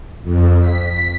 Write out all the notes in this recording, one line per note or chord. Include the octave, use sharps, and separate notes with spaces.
F2
B6